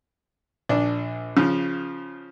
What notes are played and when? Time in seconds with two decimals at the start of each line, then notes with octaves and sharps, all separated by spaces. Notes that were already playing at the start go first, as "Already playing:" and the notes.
0.69 A#1 D4
1.37 C#3 F3